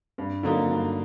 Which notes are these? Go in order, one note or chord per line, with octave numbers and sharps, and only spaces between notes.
G2
D3 F#3 A#3 D#4
G2